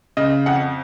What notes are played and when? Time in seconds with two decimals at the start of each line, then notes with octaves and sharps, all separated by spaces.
0.17 C#3 D#5
0.46 F2 F#5